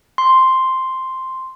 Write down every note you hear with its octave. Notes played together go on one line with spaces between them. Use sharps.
C6